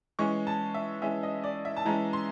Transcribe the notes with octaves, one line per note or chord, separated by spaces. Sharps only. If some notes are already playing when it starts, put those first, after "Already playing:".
E3 G#3 C#4 C#6
A5
E5
E3 G#3 C#4 E5
D#5
D5
E5
A5
E3 G#3 C#4 A#5
C6